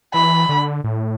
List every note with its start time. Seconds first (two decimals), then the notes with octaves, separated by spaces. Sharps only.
0.14 E3 B5
0.49 D3
0.84 A2